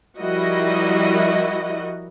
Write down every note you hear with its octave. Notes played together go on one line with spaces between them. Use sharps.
F3 G3 E4 F#4 A#4 D#5